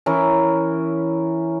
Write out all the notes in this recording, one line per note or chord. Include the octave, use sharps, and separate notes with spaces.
E3 C#4 E4 A#4